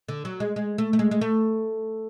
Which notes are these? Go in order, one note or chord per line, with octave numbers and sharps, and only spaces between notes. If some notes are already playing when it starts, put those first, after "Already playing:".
D3
F#3
G#3
G#3
A3
A3
G#3
G#3
A3